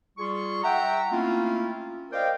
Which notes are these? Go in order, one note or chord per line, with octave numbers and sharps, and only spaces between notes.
G3 F4 G#4 C6 C#6
E5 F#5 G5 A#5
A3 A#3 C4 C#4 E4 F4
A#4 C5 D5 D#5 F5 G5